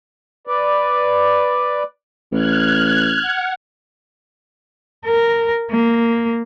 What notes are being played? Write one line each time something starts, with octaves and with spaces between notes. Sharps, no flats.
B4 D5
A1 F6 F#6 G#6
F#5
A#4
A#3